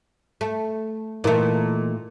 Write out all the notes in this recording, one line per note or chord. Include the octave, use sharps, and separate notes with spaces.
A3
A#2 E3 A3 D#4 A#4